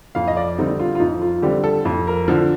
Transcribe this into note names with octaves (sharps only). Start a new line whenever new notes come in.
F2 F5
D#5
D5
D3 G3 C4 D#4
F4
F4
F2 D#4
F4
D3 G3 C4 G4
A4
F2
A#4
D3 F3 A4